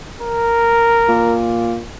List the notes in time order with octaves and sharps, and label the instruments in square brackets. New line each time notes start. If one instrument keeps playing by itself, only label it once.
[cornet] A#4
[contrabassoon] A#2